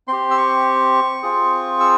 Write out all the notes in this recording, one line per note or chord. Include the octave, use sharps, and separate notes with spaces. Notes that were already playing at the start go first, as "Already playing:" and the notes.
C4 G4 C6
E6
C#6
C4 F4 G#4
E6